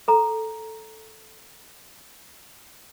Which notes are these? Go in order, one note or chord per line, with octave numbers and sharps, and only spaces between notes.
A4 A#5